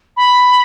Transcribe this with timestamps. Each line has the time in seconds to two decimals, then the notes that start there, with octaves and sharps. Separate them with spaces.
0.17 B5